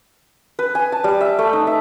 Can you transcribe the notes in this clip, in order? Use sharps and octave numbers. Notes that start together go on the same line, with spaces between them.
B4
G#5
A5
G3
E5
A3
D#4
E5